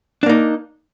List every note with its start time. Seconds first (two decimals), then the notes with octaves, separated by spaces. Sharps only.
0.23 D4
0.26 A#3
0.29 D#4